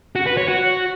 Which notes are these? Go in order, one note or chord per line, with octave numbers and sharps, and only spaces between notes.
F#4
B4
C#5
F#4